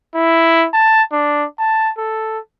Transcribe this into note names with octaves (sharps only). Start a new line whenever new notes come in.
E4
A5
D4
A5
A4